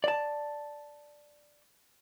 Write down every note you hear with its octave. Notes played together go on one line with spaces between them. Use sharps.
D5 A5